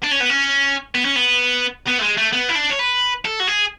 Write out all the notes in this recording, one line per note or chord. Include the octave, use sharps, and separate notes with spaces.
D4
C#4
B3
C#4
B3
C#4
B3
B3
A3
G#3
A3
B3
E4
D4
C#5
B4
A4
F#4
G#4